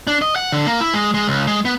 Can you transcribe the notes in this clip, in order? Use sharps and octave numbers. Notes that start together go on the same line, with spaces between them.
D4
D#5
F#5
D3
A#3
E4
G#3
G#3
C#2
G#3
B3